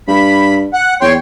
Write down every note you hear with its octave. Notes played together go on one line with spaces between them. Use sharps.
G2 B5
F#5
E2 C#5 G5 C6